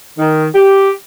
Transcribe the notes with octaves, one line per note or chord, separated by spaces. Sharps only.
D#3
G4